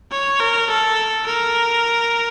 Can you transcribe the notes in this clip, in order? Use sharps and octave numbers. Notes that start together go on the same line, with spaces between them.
C#5
A#4
A4
A#4